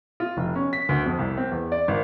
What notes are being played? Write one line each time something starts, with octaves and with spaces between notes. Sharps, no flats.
F4
F1
C#4
B6
D2
F2
C2
C4
E2
D5
G#1